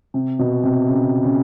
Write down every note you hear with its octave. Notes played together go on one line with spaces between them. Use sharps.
C3
B2
C3
C#3
C#3